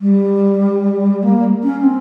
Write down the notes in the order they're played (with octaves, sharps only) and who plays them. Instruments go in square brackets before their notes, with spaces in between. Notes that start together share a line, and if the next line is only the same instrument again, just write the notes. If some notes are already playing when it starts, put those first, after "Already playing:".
[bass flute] G3
A#3
C#4
C4